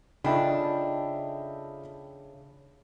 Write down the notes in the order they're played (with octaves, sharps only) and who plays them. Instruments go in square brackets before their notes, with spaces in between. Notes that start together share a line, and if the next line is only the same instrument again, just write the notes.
[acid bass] C#3 [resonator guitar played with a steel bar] D4 [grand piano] D#4 F4 A4 [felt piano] E5 G5 B5